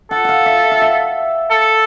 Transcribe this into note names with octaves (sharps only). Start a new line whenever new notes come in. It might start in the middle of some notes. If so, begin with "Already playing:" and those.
A4 F#5
F5 F#5
E5
F5
E5
A4